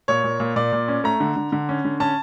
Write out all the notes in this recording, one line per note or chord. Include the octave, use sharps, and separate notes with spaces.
A#2 C#5
A#2
A#2
A#2 D5
A#2
C#4
A3 A#5
D3
D3
D3
C#4
D3
C#4 A5